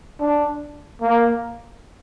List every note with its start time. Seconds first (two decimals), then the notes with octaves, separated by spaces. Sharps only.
0.20 D4
1.02 A#3